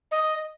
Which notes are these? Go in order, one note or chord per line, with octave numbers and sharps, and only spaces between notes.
D#5